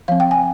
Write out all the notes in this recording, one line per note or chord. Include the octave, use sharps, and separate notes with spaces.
F3 C4 F5
G5
G#5